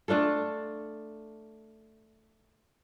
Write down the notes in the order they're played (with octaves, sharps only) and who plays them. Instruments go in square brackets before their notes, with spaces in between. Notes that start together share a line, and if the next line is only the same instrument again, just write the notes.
[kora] A3 D4 F4 A4